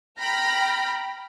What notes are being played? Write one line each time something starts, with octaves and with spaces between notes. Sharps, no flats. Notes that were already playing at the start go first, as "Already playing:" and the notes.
G5 A#5 B5 F6 A#6